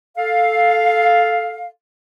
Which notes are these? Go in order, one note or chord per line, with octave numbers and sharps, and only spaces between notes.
A4 F5